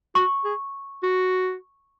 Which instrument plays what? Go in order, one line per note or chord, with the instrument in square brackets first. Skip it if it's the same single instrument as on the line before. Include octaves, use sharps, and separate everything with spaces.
[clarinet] F#4 [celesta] C#6
[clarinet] G#4
F#4